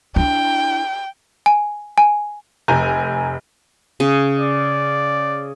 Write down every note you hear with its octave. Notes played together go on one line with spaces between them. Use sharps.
D4 E4 G5
G#5
G#5
F1 G#5 A#5 G6
C#3
D5